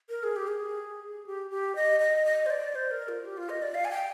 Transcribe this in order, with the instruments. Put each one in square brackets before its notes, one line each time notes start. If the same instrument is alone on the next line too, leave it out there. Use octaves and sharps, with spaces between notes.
[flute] A#4
G#4
G4
G#4
G4
G4
D#5
D#5
D#5
C5
D5
C5
A#4
F4
G4
F4
D#5
D5
F5
G#5
G5